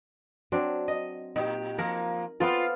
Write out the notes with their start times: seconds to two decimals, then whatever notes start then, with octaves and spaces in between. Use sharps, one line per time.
0.52 F#3 C4 D4
0.88 D#5
1.36 A#2 D#4 G4
1.78 F3 A#3 A#4
2.40 B3 C4 F4 A4